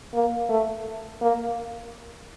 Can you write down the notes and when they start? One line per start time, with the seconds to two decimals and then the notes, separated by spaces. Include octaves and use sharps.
0.14 A#3
0.49 A3
1.21 A#3